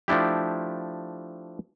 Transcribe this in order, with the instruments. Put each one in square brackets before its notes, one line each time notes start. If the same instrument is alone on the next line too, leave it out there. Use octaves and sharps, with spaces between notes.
[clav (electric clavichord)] F3 A3 D4 E4 G4